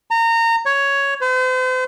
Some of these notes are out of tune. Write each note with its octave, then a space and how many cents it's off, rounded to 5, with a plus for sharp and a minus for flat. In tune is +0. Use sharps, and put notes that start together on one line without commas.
A#5 -25
C#5 +5
C5 -40